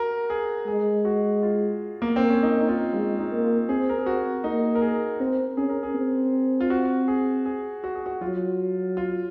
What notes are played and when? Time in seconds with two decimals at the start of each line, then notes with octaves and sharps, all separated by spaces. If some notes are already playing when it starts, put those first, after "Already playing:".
Already playing: F#4 A#4
0.30 G#4
0.67 G#3 G#4
1.05 F#4
1.43 F4
2.02 A#3
2.16 A#3 C4
2.29 C#4
2.43 D#4
2.61 D#4
2.68 F4
2.93 G#3 F4
3.19 D#4
3.31 A#3
3.44 F4
3.69 C4 G#4
3.89 A#4
3.99 G#4
4.06 F#4
4.44 A#3 D#4
4.75 A#4
4.82 G#4
5.20 C4 A#4
5.57 C#4 G#4
5.69 A#4
5.83 G#4
5.95 C4
6.60 F4
6.70 F#4
7.08 G#4
7.46 G#4
7.84 F#4
7.95 G#4
8.06 F#4
8.21 F#3 F4
8.97 F4